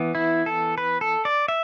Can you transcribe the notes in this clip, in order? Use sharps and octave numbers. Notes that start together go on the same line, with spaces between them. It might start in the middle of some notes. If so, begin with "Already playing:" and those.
Already playing: E3 B3
E4
A4
B4
A4
D5
E5